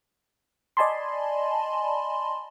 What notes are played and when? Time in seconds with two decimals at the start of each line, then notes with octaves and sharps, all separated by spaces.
0.77 D5 D#5 G#5 A5 B5 C6